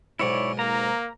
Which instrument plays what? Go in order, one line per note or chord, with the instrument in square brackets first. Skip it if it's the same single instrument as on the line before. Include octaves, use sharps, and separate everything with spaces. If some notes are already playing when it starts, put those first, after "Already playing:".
[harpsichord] B1 G#2 [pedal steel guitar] E4 C#5 D5
[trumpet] A#3 [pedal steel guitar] A#5